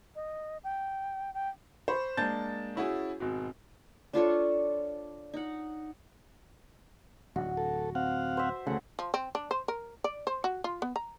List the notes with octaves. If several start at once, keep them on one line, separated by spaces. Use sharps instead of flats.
D#5
G5
G5
C5 B5 C#6
G#3 A#3 D4 A5 G6 A6
C#4 E4 F#4 G#4
G#1 B2
D4 F4 A4 C#5
D#4 F#5
D1 F#4
A4
C4 F5 F#5
C5 E5
D2 C#3 A3 F#5
F3
C4
D4
C5
A#4
D5
C5
F#4
F4
B3
A#5